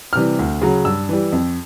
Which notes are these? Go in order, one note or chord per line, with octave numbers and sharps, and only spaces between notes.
C3 E3 G3 F6
D2
C#3 F#3
G2 E6
E3 G3
F2